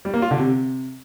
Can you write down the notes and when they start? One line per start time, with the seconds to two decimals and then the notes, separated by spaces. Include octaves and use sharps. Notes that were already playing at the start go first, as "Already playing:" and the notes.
0.05 G3
0.14 A#3
0.22 F4
0.31 D3
0.39 C3